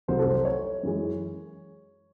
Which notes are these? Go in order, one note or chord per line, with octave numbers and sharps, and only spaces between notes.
C2 C3 F#3 A3 C5
A4
C5
C#5
F#2 E3 G#3